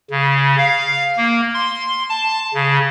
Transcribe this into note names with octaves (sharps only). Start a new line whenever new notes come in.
C#3
F5
A#3
C6
A5
C#3